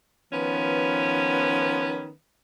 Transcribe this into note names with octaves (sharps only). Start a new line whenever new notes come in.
D#3 F3 B3 C#4 B4